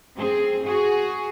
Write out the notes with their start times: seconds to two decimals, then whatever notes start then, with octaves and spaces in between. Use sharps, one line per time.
0.16 C4 G#4
0.64 F#4 G#4